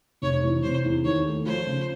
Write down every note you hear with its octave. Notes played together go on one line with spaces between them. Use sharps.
F1 C#5
E3
C3 C5
E2
D#2 C#5
A3
F3 C5
C#3